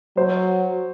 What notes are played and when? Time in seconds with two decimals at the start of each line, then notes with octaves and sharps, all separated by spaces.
0.17 F#3 C5